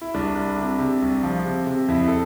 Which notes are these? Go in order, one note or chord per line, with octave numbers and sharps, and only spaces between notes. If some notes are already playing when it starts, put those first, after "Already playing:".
E4
C2 D4
C2
C3
C3
C2
F3
C3
C3
F2 E4
A4